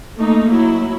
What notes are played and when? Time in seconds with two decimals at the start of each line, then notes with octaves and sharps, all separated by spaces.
0.16 A3 A#3 D#4
0.50 F#3 E4